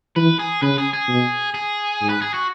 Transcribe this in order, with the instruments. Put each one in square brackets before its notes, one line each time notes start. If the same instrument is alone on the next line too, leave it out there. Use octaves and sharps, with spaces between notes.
[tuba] E3 [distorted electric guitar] B4
[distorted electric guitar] G#4
[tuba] C#3 [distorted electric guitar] B4
[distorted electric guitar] G#4
G#4
[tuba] B2
[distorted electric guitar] G#4
[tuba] G#2
[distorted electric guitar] B4
G#4
F#4